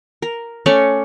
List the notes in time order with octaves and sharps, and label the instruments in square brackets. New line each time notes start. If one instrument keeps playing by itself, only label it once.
[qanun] A#4
A3 C#4 C#5 D5